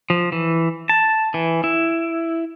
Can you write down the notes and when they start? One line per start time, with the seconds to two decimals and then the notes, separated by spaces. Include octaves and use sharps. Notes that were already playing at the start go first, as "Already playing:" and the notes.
0.10 F3
0.32 E3
0.89 A5
1.34 E3
1.64 E4